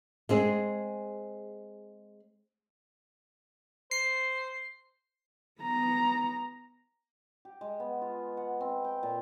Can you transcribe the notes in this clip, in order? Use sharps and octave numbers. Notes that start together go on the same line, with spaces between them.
G#3 C4 G#4
C5 C7
B3 A#5
G4
G#3
B3
F4
F#5
C4
G5
A#2